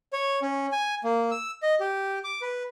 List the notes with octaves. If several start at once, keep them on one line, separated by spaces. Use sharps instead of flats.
C#5
C#4
G#5
A#3
E6
D#5
G4
D6
B4